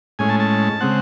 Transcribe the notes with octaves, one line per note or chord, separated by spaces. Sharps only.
A2 G#3 C#4 G#5
A5
A5
C#3 G#3 C4 F#5